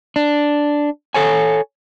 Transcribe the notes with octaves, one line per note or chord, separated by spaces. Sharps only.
D4
A4 C#5 G#5